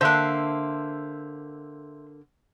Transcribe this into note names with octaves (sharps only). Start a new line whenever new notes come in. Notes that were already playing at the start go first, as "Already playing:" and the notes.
D3 A#3 C5 E5 F#6